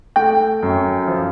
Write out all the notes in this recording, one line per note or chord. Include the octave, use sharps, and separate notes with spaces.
A3 G5
F#2
F3